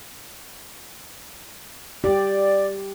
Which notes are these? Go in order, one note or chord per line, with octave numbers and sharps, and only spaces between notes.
G4 D5